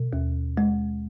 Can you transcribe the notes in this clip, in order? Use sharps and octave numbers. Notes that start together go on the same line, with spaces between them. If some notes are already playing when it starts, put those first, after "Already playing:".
Already playing: B2
D#2
G#3